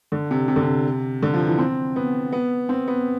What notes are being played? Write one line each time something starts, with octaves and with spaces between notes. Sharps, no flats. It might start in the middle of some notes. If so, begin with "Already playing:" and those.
D3
C3
C3
D3
C3
D3
F3
E3
C4
B3
B3
C4
B3